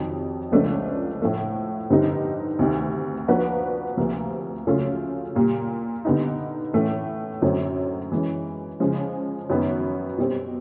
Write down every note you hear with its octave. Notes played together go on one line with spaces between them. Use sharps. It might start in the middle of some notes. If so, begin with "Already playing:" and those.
Already playing: F2 C3 D#3 F#3
C#2 C#3 F3 A3 D4
A2 F3 A3
G2 D3 G3 C4 D#4
D2 C3 D#3
F3 A#3 D4 F#4 B4
D2 C3 F3 A#3
C#3 F#3 A3 C#4 F4
A#2 G3 A#3
D3 G3 B3 D#4
A2 E3 A3 C#4
F#2 D3 F#3 A3 C4
E3 G#3 C#4
C#3 F3 G#3
F#2 D#3 F#3 B3
B2 G3 C4